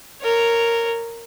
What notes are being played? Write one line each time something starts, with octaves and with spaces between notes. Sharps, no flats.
A#4 C#5